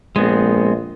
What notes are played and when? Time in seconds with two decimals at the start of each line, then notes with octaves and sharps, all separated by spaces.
0.16 A#1 G#3 B3 C4